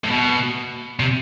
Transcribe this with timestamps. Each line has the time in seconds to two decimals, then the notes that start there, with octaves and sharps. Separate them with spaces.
0.04 A2
0.10 B2
1.00 C3